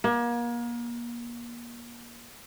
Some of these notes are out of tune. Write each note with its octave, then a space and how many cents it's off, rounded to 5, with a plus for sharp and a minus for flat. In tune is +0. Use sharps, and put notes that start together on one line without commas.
A#3 +35